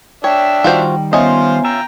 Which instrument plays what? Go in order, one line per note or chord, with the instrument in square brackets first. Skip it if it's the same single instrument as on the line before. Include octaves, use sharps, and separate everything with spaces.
[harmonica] D4 E5 [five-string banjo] C#5 [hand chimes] G5
[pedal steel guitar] D#3 G3 [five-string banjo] F4 F#4 C5
[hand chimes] B3 E5 G#5 [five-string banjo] C#4 D#5 [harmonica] F4 C5
[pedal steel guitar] F4 E5 [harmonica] G5 A#5